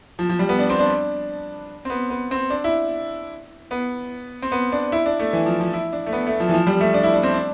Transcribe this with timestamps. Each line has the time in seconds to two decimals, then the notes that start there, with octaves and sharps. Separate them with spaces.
0.19 F3
0.29 F3
0.39 G3
0.49 B3
0.59 D4
0.70 C4
0.79 D4
1.85 C4
1.90 B3
2.10 B3
2.31 C4
2.50 D4
2.64 E4
3.71 B3
4.42 C4
4.52 B3
4.72 D4
4.92 E4
5.06 D4
5.20 A3
5.33 E3
5.46 F3
5.60 F3
5.73 E4
5.93 D4
6.06 A3
6.12 B3
6.27 A3
6.40 F3
6.49 E3
6.54 F3
6.67 G3
6.81 A3
6.94 D4
7.03 E4
7.14 D4
7.23 C4
7.34 D4